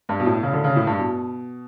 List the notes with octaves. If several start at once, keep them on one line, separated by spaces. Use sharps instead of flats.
G2
B2
A2
C#3
D3
C#3
A2
G2
B2